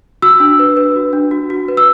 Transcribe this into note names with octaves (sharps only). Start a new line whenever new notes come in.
F#4 E6
D4
B4
B4
F#4
D4
F#4
F#4
B4
E6